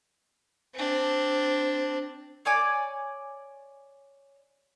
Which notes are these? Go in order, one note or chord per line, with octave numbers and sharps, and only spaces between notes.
C4 D4
C#5 D5 G#5 D6